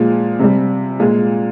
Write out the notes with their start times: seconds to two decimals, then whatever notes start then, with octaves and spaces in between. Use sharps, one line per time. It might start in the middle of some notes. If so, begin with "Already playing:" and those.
Already playing: A#2 F3 G#3
0.39 C3 G3
1.00 A#2 G#3